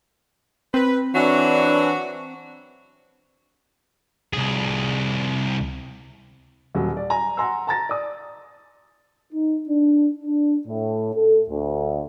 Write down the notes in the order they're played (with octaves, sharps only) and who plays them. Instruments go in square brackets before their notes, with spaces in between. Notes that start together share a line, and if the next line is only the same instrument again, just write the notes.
[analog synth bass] C4 [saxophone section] B4
[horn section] E3 D4 [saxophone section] F#3 F#4
[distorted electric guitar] C2 G#4
[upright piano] D#1 F#3
D5
G#5 A#5
F#5 G#5 A#5 C6 E6
A5 A#5 A6 A#6
D5 D#6
[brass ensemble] D#4
D4
D4
A2
A4
D2